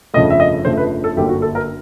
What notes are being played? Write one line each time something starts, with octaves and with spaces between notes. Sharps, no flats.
G1 F2 C#3 F3 A3 D#5
E5
D#5
G1 F2 C#3 F3 A3 C5
B4
A4
G1 F#2 D3 F#3 A#3 G4
F#4
A4
A#4